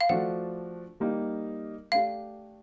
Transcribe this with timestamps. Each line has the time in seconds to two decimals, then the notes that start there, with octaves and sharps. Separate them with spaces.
0.01 F5
0.09 F3 A3 D4 F#4 F#5
1.00 G3 A#3 D#4 G4
1.92 A3 D4 G4 F5